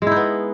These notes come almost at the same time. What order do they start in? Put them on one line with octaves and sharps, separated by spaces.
G#3 E4 D#4 B3